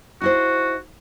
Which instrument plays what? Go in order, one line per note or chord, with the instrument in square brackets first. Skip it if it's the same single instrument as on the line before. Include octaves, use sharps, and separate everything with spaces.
[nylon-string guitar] D#4 E4 C5 [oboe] F#4